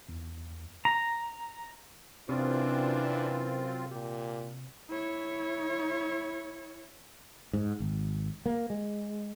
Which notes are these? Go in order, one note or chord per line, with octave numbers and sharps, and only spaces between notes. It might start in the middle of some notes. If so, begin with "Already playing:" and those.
E2
A#5
F#2 C3 E3 C4 D4 F4
A#2 G4
E4 C#5
G#2
G#1
A#3
G#3